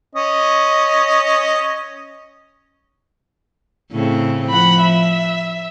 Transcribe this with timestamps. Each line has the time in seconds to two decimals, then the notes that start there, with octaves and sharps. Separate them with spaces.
0.15 C#4 D#5
3.91 A2 C#3 C4
4.50 F3 F#5 B5
4.81 E5